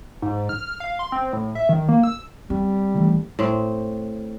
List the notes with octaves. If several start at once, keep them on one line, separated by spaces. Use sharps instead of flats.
G#2
F6
F5
C6
C4
A2
E5
D#3
A#3
E6
G3 C4
D#3 E3 A3
A2 C4